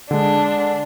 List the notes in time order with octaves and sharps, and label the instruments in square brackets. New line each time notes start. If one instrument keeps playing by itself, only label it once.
[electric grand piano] D3 G#3 [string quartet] D4